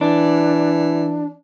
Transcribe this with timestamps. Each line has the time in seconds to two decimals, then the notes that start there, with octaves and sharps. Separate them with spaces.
0.01 E3 D4